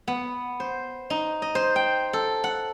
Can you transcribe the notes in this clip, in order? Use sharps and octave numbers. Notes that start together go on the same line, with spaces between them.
B3
C5
D#4
D#5
C5
G5
A4
F#5